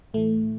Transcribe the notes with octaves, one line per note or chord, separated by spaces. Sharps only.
A2 E3 A3